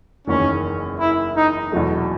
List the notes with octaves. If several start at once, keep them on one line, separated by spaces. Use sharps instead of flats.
F#1 E2 D#3 C#4
E4
D#4
E2 B2 F#3 A3